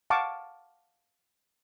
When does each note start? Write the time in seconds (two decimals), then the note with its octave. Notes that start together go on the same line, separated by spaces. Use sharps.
0.10 F5 F#5 A5 C#6 D6